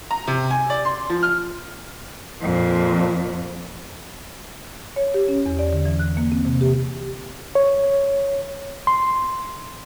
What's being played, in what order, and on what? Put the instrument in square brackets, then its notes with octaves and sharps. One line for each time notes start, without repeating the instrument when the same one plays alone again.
[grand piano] A#5
C3
G#5
D5
C6
F3
F6
[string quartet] F2 A#2
[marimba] C#5
G4
C#4
E2
D5
D3
E3
F#6
A#3
C4
C3
G4
[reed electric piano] C#5
C6